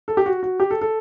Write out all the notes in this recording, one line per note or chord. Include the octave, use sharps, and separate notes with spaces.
A4
G4
F#4
F#4
G4
A4
A4